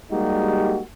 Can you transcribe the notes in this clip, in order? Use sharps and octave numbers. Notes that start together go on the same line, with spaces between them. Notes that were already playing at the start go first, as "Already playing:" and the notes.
G3 G#3 A#3 D#4 F#4 G4